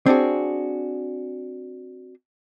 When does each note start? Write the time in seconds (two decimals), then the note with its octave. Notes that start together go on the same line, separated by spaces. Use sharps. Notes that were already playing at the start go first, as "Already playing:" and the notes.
0.06 C4 D4 F#4 G#4